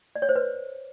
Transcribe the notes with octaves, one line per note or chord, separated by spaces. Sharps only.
D5
C#5
C5
B4